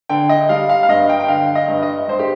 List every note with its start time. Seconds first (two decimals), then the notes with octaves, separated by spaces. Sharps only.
0.09 D3 G5
0.29 D#5
0.49 G3 F5
0.69 F5
0.83 F5
0.89 G2 D#5
1.09 G5
1.20 G5
1.28 D3 F5
1.55 D#5
1.68 G2
1.83 D#5
2.08 G2 C5
2.19 G4